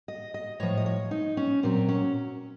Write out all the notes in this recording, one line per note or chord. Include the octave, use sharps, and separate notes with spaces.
D#5
D#5
A2 F3 C#5
D#5
C#5
D#4
C#4
A#2 F#3 C4
C#4